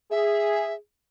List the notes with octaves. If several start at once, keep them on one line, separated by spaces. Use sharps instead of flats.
G#4 E5